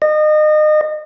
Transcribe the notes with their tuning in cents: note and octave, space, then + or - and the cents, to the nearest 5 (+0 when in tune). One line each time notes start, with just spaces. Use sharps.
D#5 -30